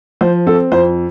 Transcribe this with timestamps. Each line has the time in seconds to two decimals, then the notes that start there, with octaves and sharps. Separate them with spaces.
0.21 F3 C5
0.47 C4 A4
0.72 F2 C5